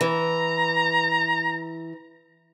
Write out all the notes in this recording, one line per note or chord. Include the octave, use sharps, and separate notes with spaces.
E3 A#5